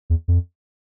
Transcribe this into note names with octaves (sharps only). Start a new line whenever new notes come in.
E2
F2